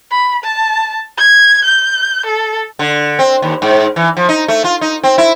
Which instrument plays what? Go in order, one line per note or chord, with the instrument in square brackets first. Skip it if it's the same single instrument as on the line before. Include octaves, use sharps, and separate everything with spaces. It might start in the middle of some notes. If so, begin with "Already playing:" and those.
[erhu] B5
A5
G#6
G6
A4
[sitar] D3
C4
D#2
G#2
E3
F3
D#4
A3
F4
D#4
C4
E4